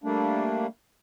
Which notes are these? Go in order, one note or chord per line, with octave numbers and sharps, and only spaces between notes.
G3 A3 A#3 D4